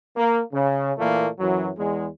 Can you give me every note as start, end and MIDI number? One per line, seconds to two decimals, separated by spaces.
0.17 0.41 58
0.52 0.92 49
0.98 1.28 46
0.98 1.28 52
0.98 1.28 57
0.98 1.28 58
1.39 1.70 42
1.39 1.70 52
1.39 1.70 54
1.77 2.07 40
1.77 2.07 56